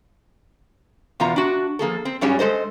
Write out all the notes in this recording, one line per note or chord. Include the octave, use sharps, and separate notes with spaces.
E2 B2 F4 A#5
D4 F#4
F3 A#3 G#4 A4
C4
G2 F#3 G3 C#4 G#4
G#3 A4 C5 D#5